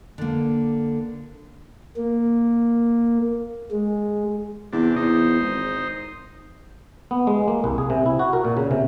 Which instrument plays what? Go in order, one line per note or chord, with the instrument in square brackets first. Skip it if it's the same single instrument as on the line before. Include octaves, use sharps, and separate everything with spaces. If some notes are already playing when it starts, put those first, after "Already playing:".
[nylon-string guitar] D3 A#3
[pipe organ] A#3
G#3
[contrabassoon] E2 [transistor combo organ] C3 D4
[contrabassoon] E2 [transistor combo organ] D#4 C5
[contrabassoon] G#1
[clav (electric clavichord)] B3
G#3
A#3
C2
G#4
C3
E4
F#4
A#4
A#2
C#3
C3